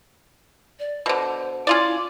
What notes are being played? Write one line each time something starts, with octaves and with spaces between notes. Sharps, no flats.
D5
B2 D3 C5
C#4 E4 F4 D5